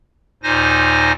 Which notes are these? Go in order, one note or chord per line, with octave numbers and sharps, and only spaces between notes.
D#2 A#2 D#4 C5 G#5 A#6